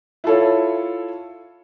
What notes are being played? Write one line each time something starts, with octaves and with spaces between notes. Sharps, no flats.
E4 F4 A4 C#5